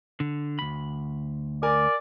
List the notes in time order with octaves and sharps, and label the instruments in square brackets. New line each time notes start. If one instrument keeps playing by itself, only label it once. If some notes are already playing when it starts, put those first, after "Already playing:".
[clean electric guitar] D3
D2 B5
[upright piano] A#4 G#5 [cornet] D5